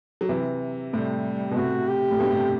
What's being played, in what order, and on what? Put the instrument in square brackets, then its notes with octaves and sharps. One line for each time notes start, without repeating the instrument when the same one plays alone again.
[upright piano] F#3
C3 E3
[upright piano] A2 C3 [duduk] G3
[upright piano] B2
[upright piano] A2 C3 [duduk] F#4
[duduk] G4
[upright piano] A2
G2 B2
A2 C3